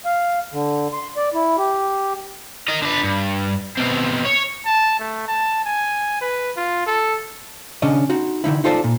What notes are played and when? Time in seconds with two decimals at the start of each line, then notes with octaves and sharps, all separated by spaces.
0.05 F5
0.52 D3
0.93 C6
1.17 D5
1.34 E4
1.58 G4
2.69 A#4 D#5
2.82 D3 B4
3.04 G2
3.78 B2 C4
4.25 C#5
4.66 A5
4.99 A3
5.28 A5
5.65 G#5
6.21 B4
6.57 F4
6.87 A4
7.82 C#3 C#4 D4 D#5
8.10 D#4 F#4
8.44 D3 D#3 D#4 E4
8.64 D#4 F4 A4 C5 D5
8.84 A#2